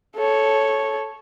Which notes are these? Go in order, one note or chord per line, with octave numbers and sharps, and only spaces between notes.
A4 C#5